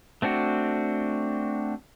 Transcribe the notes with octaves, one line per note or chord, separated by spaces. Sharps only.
A3 C4 D4 F#4